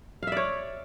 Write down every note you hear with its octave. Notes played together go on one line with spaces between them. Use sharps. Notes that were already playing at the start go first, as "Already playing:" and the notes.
C#5 D5 E5 F5